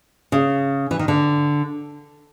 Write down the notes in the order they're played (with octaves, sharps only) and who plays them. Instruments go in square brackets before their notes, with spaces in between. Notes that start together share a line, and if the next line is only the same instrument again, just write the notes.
[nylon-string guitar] C#3
E3
D#3
D3